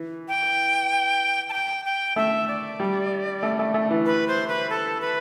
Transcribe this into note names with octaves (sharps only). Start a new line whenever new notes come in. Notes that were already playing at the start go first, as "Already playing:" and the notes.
Already playing: E3
G5
A5
G5
G5
A3 E5
D5
G3
A3
A3
A3
E3
B4
C5
B4
A4
B4